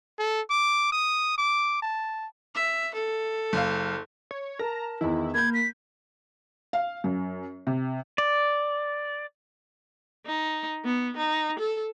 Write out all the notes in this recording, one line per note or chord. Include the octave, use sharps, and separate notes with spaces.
A4
D6
D#6
D6
A5
E5
A4
F#1 F5
C#5
A#4 A5 A#5
E2 D#3 E4
A#3 B5 G6 G#6
B6
F5
F#2
C3
D5
D#4
B3
D#4
A4